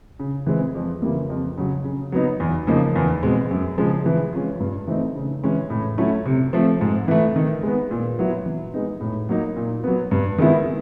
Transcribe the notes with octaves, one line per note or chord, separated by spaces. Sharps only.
C#3
E3 G#3 C4
F2
C#3 E3 G3 A#3
F2
C#3 F#3
C#3
F#3 B3 D#4
E2
C#3 F3 A#3 D#4
E2
B2 G#3 C4
F#2
C#3 F3 G#3
E3
G#3 C#4 F4
G2
E3 A3 C4 D#4
C#3
E3 G#3 C#4
A2
F#3 A3 C#4 E4
C3
F3 A3 C4
G#2
E3 A3
D#3
G#3 B3
A#2
F#3 B3 E4
E3
G#3 B3 D#4
A2
F#3 A#3 D#4
A#2
F#3 B3
G2
D#3 G#3 B3 E4